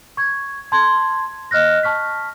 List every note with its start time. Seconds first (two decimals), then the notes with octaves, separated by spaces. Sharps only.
0.17 C#6 G#6
0.72 A5 C6 G#6
1.51 D#5 F6 F#6 A#6
1.83 A5 C#6 F6 B6